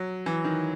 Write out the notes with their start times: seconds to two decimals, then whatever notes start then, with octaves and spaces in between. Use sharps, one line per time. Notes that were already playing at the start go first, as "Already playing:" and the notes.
Already playing: F#3
0.26 E3
0.45 D#3